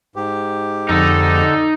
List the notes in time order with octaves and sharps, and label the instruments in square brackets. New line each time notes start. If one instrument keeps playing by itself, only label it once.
[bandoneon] G#2 G4
[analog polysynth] F2 [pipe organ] D3 A4 [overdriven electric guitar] D#4